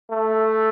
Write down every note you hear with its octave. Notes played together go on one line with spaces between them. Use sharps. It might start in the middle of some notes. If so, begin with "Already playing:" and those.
A3